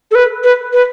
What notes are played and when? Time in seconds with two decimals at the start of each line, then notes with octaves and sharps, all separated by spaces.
0.11 A4
0.15 B4
0.44 B4
0.73 B4